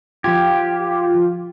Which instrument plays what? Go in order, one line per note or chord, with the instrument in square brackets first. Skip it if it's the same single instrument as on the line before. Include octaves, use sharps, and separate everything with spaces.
[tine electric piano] F3 G5 G#6 [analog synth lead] F4 [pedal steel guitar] G4